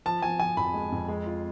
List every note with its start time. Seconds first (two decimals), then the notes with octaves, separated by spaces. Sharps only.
0.06 F3 A5
0.22 F3 G#5
0.39 F3 G#5
0.57 F2 B5
0.74 G#3
0.92 F2
1.08 G#3
1.26 F4